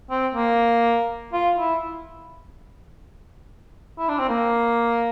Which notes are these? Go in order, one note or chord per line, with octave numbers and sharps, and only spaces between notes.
C4
A#3
F4
E4
E4
D4
C4
A#3